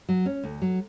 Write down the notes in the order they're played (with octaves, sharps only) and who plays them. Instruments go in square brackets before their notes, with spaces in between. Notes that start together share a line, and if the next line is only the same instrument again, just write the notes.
[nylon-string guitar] F#3
C#4
D2
F#3